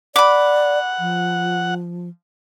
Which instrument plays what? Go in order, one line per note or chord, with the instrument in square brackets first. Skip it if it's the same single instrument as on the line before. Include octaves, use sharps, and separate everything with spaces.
[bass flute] D5 [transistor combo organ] F#5 [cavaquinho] B5 D6
[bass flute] F3